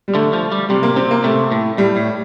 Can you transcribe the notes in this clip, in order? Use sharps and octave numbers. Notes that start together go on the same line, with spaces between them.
G3
D3 A3
F3
G3
C3 G3
A#3
C3 C4
A#3
C3 A3
A2
A2 G3
A2